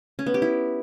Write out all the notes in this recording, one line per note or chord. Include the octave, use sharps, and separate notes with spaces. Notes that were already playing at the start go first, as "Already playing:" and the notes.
C#4
B3
G4
E4